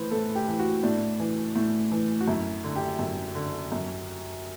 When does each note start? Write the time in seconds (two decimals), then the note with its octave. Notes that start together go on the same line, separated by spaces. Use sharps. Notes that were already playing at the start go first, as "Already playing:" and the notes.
Already playing: A2 E3 B4 C5
0.11 A2 A4
0.35 G4
0.48 E3
0.59 F#4
0.83 A2 D4
1.20 E3
1.56 A2
1.92 E3
2.21 F#4
2.28 F#2 E4
2.64 D3
2.76 G4
2.99 F#2
3.35 D3
3.72 F#2